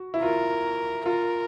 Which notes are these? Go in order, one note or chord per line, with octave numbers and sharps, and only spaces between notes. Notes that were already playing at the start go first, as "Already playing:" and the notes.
Already playing: F#4
E4
F4 A#4
F4 A#4